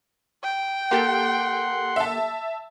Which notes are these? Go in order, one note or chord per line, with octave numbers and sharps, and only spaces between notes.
G5
A#3 G4 A4 F#5 C6
E5 A5